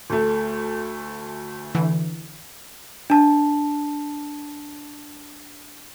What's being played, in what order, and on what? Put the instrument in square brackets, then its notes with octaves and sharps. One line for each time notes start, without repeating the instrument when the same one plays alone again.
[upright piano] D2 A3
[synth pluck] D3 E3
[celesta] D4 A5